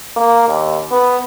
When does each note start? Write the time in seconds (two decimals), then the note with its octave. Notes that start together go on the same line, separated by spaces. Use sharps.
0.17 A#3
0.48 D#2
0.91 B3